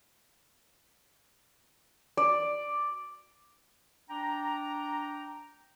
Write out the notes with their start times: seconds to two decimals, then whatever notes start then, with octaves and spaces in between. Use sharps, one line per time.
2.17 D5
4.09 D4 G5 A#5